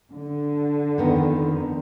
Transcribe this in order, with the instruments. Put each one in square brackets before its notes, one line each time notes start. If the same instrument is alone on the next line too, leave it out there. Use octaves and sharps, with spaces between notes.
[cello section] D3
[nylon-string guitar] F2 D#3 B3